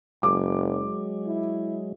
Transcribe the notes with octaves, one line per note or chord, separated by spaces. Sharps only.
F#1 F#3 G#3 D6
E4